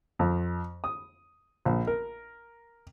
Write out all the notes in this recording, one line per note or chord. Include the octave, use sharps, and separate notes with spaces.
F2
D#6
A#1
A#4